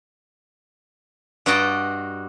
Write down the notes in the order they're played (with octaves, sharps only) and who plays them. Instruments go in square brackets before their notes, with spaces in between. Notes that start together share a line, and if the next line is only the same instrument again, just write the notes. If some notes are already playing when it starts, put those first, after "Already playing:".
[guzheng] G2 F#4 D#5 G5 A5